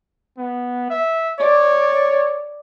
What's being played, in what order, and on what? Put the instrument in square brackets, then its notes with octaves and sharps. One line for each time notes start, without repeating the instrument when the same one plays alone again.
[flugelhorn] B3
E5
[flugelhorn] C#5 [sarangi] D5